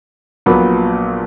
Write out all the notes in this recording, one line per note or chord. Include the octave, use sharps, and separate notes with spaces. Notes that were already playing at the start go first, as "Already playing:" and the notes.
A#1 A#2 F#3 B3